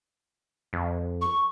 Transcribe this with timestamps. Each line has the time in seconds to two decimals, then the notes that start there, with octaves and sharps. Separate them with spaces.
0.73 F2
1.22 C#6